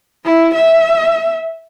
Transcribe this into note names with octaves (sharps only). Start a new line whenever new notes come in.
E4
E5